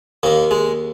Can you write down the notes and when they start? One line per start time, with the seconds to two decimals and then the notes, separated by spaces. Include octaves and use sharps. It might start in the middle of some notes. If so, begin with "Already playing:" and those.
0.23 D#2 D#3 A#3
0.51 G#3